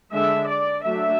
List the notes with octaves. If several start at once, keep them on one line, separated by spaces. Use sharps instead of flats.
D3 G#3 D4 E5
D5
F#3 A3 D4 E5